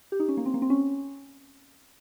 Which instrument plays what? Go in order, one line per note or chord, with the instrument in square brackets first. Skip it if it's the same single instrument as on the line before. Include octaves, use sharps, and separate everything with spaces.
[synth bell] G4
D#4
C#4
A#3
C4
A#3
C4
C#4